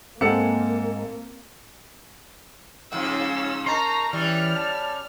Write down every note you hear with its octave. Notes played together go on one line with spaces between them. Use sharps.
G#2 G#3 A#3 C4 A4 F#5 C#7
G#2 C#3 F3 C#4 E6
D#4 A#4 A5 A#5 C6 C#6
E3 G3 C#4 D5 F6
A5